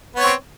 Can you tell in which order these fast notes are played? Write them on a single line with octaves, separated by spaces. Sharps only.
B3 C#5 C4